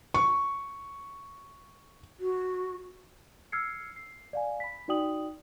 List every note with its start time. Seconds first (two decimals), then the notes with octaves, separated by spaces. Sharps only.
0.14 C#6
2.20 F#4
3.52 E6 F6 G#6 C7 C#7
3.96 C7
4.33 D5 F5 G#5
4.60 B5 B6
4.88 D#4 F#4 D5 G5 D#6 F#7